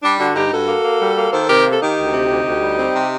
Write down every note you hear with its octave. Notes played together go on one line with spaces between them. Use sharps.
G3 D4
D3 D4 F#4
G2 D#4 G4
G2 F#4 A4
A#3
A#3
G3
A#3
D#3 A4 C5
C3 G4 A#4
A#3
A4
D#3 D#4 G4
D2
C3
D2
D2
G3
C4
C3